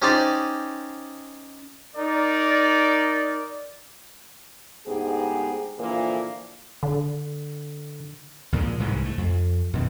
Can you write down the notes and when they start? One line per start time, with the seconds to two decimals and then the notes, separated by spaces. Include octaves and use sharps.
0.02 C#4 D#4 G4 C5 D5
1.96 D#4 A#4 D5
4.86 D2 G#2 B3 G4 G#4
5.79 A#2 D3 E3 F3 A#3
6.83 D3
8.52 D2 A#2 F3 G#3
8.80 C2 G#2 E3 G#3
9.05 A3
9.18 F2
9.73 F#2 B2 D#3